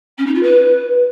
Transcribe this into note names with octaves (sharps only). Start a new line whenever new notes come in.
C#4
D#4
F4
B4